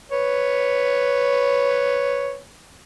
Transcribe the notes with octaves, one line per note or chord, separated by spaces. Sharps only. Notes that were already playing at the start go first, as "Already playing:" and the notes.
B4 C#5